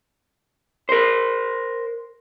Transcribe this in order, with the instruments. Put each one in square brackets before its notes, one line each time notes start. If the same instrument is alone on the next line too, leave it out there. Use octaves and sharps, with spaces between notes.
[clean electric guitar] A#4 C5